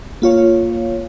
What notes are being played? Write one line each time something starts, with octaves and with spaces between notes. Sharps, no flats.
A#3 F4 C#5 F5